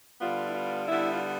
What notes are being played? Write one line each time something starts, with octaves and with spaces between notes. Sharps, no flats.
D3 G3 B3 F4
E4
F4
D3 G3 B3 E4
F4